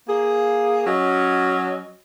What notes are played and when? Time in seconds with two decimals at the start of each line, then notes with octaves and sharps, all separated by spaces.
0.09 A#3 G#4
0.86 F#3 C#4 F#4 D#5